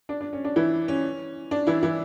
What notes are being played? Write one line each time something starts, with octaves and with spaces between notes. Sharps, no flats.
D4
D4
C#4
D4
E3 E4
C#4
D4
E3 E4
E3 E4